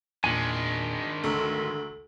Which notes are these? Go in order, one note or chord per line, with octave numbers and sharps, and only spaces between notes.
E2 A#2 D#3 G#3 D4 G#5 C#7
D2 A#5 C#6 E6